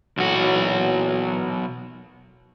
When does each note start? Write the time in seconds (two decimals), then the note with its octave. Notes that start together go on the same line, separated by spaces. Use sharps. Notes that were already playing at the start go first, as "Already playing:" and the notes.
0.17 B1 A#2 E3 F#3 F#4